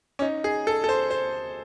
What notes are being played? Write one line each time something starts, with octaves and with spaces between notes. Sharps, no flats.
C#4
D#4
G#4
A4
A4
C5
C5